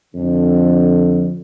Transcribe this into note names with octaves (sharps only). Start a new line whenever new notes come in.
F2 D3